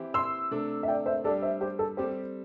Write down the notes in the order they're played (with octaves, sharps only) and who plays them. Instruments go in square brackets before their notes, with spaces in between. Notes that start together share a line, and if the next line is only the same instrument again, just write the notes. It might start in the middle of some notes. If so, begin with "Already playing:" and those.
Already playing: [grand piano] E3 C4 E4 G4
[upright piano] C6 E6
[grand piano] C3 A3 D4 A4
[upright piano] E5
D5 G5
C5 E5
[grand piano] G3 D4 G4 [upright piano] A4 D5
[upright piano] C5 E5
G4 C5
A4
[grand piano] G3 C4 A4 [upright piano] G4 C5